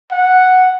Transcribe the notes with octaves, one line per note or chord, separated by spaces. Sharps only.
F#5